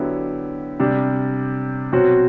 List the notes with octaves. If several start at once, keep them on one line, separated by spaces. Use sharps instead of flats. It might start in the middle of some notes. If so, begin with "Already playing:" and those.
Already playing: D3 F#3 B3 E4 G4
C3 G3 D4
B2 F#3 C4 F#4